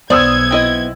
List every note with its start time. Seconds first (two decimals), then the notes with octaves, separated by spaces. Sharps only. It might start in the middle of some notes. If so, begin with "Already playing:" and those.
0.10 B1 B3 C5 D5 D#6 E6 G#6
0.51 C4 E4 D#5